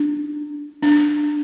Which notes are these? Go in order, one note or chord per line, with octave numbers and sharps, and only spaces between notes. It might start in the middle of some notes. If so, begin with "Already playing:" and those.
Already playing: D4
D4